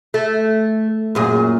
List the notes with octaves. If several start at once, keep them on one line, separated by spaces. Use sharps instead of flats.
A3
F#2 A#2 G#4